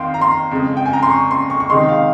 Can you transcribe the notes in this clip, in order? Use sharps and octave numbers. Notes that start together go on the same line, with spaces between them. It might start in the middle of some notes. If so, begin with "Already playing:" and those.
Already playing: F2 D#3 F5 G5 C6
A#5
C6
F2 C#3 G#3
G5
G#5
A#5
C6
C#6
C6
C#6
C#6
C3 D#3 G#3 D#4 C6
F5